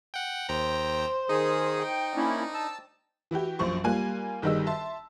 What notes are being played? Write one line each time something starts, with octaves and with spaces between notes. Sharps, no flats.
F#5 G5
D#2 C5 G5 A#5
D#3 D#4 G#4 D#6
G5
A#3 C#4 D4 E4
A5 E6
E3 E4 F#4 G4
A#1 F#2 F4 C5 C#6
G3 A#3 F4 G#5 F#6
G1 D#3 G3 D#4 G#4 E6
E5 A5 C6